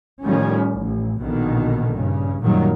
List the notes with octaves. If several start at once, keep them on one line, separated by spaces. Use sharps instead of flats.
A2 D#3 F3 G3 C#4
A1
A#1 B2 D3 D#3
G2 C#3
F#2 A#2 D#3 F#3 G3